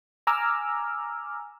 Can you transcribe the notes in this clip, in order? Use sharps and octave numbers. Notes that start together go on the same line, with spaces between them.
G#5 A#5 D6 E6 F6